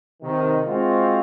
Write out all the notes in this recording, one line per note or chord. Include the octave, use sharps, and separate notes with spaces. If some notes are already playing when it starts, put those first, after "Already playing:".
C3 D#3
G#3 C4 F4 F#4